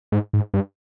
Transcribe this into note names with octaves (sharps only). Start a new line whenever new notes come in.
G#2
G#2
G2